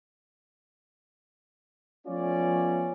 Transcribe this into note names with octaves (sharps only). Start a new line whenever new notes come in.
F3 A3 B3 C#4 F4 D5